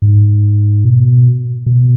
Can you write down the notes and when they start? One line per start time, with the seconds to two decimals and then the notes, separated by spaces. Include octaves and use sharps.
0.02 G#2
0.85 B2
1.66 B2